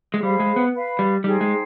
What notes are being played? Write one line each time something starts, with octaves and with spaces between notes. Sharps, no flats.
G#3
G3 G#4 C5 F5 B5
G#3
B3
B4 F5 B5
G3
G3 D#4 G#4 C5 G5
G#3